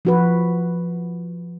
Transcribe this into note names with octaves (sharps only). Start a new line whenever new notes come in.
F3 F#4 B4